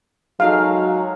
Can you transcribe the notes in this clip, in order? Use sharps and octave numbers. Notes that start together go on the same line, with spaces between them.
F#3 G#3 D#4 A4 F5